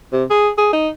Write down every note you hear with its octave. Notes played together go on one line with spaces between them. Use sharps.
C3
G#4
G#4
D#4